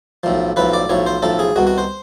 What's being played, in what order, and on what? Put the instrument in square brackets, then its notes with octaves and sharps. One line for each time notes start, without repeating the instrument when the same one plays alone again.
[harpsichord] B1 A2 F3
B1 A2 F3 B4
D5
B1 A2 F3 C#5
C5
B1 A2 F3 A4
G#4
C2 B2 F#4
F#4
C5